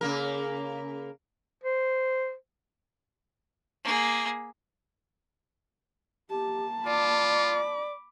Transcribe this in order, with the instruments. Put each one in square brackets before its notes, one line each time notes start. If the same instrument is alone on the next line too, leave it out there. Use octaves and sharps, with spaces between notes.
[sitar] C#3 A#3 A#4
[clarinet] C5
[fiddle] A#3 G#4
[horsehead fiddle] A#3 A5 [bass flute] G4
[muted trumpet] F4 [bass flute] D5 [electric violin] B5 D6